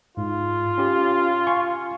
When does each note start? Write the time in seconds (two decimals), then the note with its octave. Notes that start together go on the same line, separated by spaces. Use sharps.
0.17 G#2 F4
0.78 C#4 G4
1.47 F5 G#5 C#6